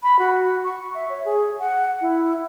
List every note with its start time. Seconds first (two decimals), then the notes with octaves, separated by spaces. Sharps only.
0.03 B5
0.19 F#4
0.64 C#6
0.94 E5
1.09 C#5
1.25 G#4
1.59 F#5
2.01 E4